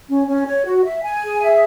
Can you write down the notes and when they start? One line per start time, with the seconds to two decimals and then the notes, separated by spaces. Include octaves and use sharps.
0.08 C#4
0.27 C#4
0.47 C#5
0.65 F#4
0.84 E5
1.03 G#5
1.22 G#4
1.41 E5